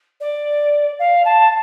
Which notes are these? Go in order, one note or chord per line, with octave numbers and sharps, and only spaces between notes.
D5
F5
A5